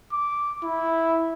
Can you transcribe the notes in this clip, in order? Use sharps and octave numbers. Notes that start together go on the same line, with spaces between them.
D6
E4